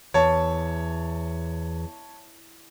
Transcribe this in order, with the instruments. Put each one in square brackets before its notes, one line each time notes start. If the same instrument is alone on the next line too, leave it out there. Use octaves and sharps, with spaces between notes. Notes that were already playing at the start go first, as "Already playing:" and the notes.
[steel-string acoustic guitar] E2 [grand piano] C#5 A5